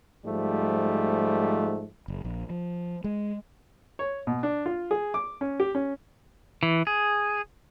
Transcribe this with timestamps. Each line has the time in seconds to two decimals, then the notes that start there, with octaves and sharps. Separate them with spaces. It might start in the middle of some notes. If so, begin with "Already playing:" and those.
0.24 G#2 F3 G3 A3
2.08 F#1
2.25 A#1
2.50 F3
3.04 G#3
3.99 C#5
4.27 B2
4.43 D4
4.66 F4
4.91 G#4
5.14 D6
5.41 C#4
5.60 G4
5.75 C#4
6.63 E3
6.87 G#4